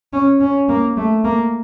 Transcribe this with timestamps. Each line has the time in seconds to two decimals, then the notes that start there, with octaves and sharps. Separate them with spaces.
0.13 C#4
0.40 C#4
0.69 A#3
0.97 A3
1.24 A#3